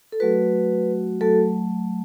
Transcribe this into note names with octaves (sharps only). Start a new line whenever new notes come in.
A4
F#3 A3 F#4 B4
F#3 A3 F#4 A4